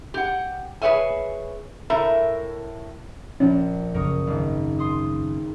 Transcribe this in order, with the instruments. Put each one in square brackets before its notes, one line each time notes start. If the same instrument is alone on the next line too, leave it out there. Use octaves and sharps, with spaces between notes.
[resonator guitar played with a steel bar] G4 F#5
G#4 B4 C#5 E5 G#5
A2 A#4 E5
[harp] A#1 [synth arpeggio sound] C#4
[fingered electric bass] F#2 C#3 [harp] A#4 C#6 D#6
[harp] G#1
C6 D#6